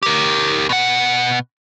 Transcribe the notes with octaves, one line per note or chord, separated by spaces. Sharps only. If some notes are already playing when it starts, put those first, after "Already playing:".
G4 A#4
B2 F#5